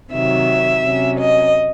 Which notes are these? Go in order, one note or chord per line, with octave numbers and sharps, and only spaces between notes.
C3 D#3 F#3 E5
C3 F#3 C#4
D#5